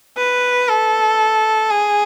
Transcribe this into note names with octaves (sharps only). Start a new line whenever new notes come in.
B4
A4
G#4